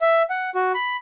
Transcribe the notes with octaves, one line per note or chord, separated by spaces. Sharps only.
E5
F#5
F#4
B5